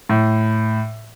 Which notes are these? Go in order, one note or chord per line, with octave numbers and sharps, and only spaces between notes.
A2